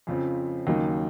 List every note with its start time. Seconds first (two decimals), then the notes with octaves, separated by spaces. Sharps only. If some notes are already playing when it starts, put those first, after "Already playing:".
0.07 F2 C#3 F3 C4
0.67 D#2 C#3 F#3 A#3 D#4